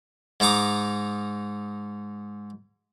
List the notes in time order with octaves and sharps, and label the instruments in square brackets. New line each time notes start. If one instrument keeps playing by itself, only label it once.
[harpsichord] G#2 D#4 A#5 D6 D#6